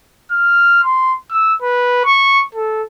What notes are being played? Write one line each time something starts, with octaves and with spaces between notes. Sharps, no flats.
F6
C6
E6
B4
C#6
A4